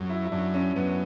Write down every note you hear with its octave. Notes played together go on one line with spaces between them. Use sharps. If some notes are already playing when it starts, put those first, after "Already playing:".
Already playing: F#2
E4
E4
F#2 D4
C#4
F#2 B3